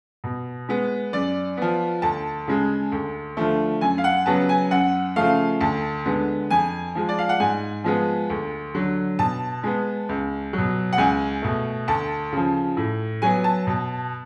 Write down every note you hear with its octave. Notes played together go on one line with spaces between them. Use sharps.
B2
G#3 B3
F#2 D5
F3 B3
D2 A5
C#3 G#3
D2
D3 F3 A3
F#2 G#5
F5
F#5
C#3 F#3 B3 A5
G#5
F#2 F#5
C#3 F3 A3 F5
D2 A5
D3 G#3 B3
F2 G#5
F3 G#3
D5
F5
F#5
G#2 G#5
F3 G#3 B3
D2
D3 F#3
B2 A5
G#3 B3
C#2
F#3
B2
F#5
C#2 G#5
B2 A3
D2 A5
C#3 F3
A2
F#3 B3 G#5
A5
B2